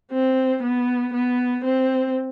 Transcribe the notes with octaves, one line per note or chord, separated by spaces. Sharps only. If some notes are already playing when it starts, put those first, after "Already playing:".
C4
B3
B3
C4